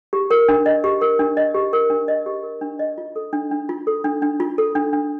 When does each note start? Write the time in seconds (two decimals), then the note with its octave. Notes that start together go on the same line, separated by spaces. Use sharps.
0.13 G4
0.31 A#4
0.48 D4
0.66 D#5
0.84 G4
1.01 A#4
1.19 D4
1.37 D#5
1.54 G4
1.73 A#4
1.90 D4
2.08 D#5
2.26 G4
2.43 A#4
2.61 D4
2.79 D#5
2.98 F4
3.16 A4
3.33 D4
3.51 D4
3.69 F4
3.87 A4
4.04 D4
4.22 D4
4.40 F4
4.58 A4
4.75 D4
4.93 D4